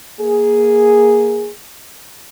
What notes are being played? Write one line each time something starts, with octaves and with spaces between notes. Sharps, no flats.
A#3 G#4